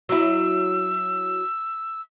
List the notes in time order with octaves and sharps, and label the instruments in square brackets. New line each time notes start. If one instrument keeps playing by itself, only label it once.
[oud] F#3 E4 [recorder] E6